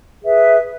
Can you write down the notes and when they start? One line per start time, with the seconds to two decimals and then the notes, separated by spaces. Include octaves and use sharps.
0.22 G#4 B4 E5